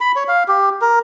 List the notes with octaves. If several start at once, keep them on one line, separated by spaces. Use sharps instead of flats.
B5
C#5
F5
G4
A#4